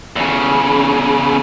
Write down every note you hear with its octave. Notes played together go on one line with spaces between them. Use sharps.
E2 C#3